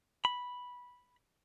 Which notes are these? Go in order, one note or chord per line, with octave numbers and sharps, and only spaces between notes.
B5